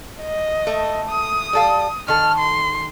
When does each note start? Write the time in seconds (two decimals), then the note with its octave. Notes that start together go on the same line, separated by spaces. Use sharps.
0.21 D#5
0.67 A3
1.10 D#6
1.53 G3 A4 F5
2.08 D#3 A4 F6
2.39 C6